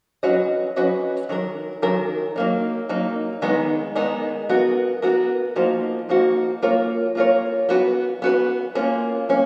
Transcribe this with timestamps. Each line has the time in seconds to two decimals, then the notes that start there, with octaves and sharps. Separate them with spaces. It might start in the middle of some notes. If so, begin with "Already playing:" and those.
0.23 F#3 C#4 F#4 B4 D#5
0.76 F#3 C#4 F#4 B4 D#5
1.29 D#3 F#3 A#4
1.82 D#3 F#3 A#4
2.36 F#3 A#3 D#4
2.89 F#3 A#3 D#4
3.42 D#3 G#3 B3 D#4
3.96 D#3 G#3 B3 D#4
4.49 B3 F#4 A#4
5.02 B3 F#4 A#4
5.56 F3 A#3 D#4 F#4
6.09 F3 A#3 D#4 F#4
6.62 A#3 F4 A#4 C#5
7.15 A#3 F4 A#4 C#5
7.69 B3 F#4 B4
8.22 B3 F#4 B4
8.75 A#3 C#4 F4
9.29 A#3 C#4